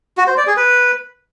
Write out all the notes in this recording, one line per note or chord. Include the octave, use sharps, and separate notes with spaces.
F#4
C5
D5
G#4
B4